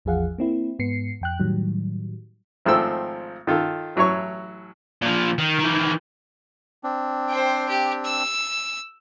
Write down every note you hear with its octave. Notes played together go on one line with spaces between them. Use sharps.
A1 E2 F3 G#4 F5 F#5
A#3 C4 E4
G#2 B3 C7 C#7
F2 G5 F#6
A2 D#3 F#3 G3
G#1 F3 A3 C5 G5 E6
D#3 F4 A4
A1 F#3 E4 C#5 C#6
A#2 F3
D#3
D#3 E3
C4 D4
C5 G5
G4
E6